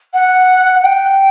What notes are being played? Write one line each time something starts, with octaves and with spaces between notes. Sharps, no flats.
F#5
F#5
G5